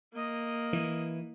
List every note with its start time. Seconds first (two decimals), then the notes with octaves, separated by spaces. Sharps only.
0.13 A#3 D#5
0.73 E3